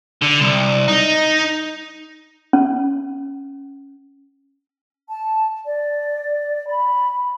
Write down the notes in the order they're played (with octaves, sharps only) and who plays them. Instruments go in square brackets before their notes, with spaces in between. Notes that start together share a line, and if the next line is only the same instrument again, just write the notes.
[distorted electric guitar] D3
C2
D#4
[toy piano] C#4
[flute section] A5
D5
B5